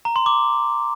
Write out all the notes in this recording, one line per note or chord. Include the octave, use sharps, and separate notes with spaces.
A#5
C6
D6